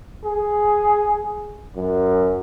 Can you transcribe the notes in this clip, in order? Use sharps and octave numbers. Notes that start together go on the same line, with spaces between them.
G#4
F#2